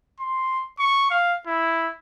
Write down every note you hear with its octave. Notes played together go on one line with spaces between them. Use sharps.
C6
C#6
F5
E4